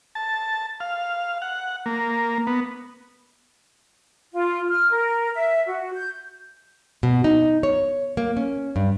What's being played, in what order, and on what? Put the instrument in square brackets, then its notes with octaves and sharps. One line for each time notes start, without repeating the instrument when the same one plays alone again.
[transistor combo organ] A5
F5
F#5
A#3
B3
[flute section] F4
F6
A#4
E5
F#4
G6
[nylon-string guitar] B2
D#4
C#5
A#3
C#4
G2